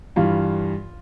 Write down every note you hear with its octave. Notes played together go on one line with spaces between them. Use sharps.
G2 E3 F4